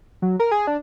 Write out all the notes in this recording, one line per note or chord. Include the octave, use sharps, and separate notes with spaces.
F#3
A#4
G#4
D4